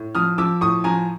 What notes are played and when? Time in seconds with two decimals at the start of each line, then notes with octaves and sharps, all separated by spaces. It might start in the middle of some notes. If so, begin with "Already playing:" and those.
Already playing: A2
0.15 F3 D#6 F6
0.38 F3 D6 E6
0.61 A2 C#6 D#6
0.84 F3 G#5 A#5